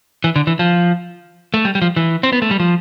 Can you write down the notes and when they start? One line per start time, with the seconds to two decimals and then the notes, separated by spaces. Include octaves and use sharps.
0.24 E3
0.36 D3
0.47 E3
0.59 F3
1.54 A3
1.65 G3
1.75 G3
1.82 F3
1.96 E3
2.23 C4
2.33 B3
2.42 A3
2.51 G3
2.60 F3